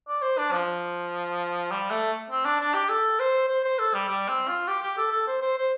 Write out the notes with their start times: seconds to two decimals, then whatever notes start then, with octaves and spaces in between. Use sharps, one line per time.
0.08 D5
0.22 C5
0.38 D4
0.52 F3
1.71 G3
1.91 A3
2.31 C4
2.45 D4
2.60 D4
2.74 G4
2.89 A4
3.19 C5
3.48 C5
3.64 C5
3.79 A4
3.94 G3
4.08 G3
4.28 C4
4.48 F4
4.68 G4
4.82 G4
4.97 A4
5.12 A4
5.27 C5
5.41 C5
5.57 C5